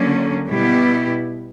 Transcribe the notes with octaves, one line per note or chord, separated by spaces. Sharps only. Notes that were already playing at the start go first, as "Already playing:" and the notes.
Already playing: D3 F#3 A#3 C#4
B2 G3 B3 E4 G4